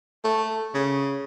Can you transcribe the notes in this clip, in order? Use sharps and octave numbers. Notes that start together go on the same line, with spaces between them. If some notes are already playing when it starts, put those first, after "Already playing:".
A3
C#3